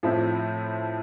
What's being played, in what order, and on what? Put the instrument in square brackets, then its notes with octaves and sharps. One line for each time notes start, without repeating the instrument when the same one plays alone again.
[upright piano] A2 F3 C4 E4